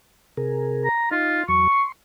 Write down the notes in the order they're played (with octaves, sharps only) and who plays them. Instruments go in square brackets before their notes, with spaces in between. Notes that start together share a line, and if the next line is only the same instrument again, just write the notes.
[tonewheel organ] C3 G#4 A#4
[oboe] A#5
[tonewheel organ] D#4 [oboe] F4
[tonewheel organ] E2 F#3 [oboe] C#6
[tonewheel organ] C6